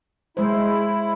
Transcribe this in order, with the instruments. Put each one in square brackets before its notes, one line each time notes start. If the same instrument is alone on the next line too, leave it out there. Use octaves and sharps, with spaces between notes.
[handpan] G#3 C5 [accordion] E4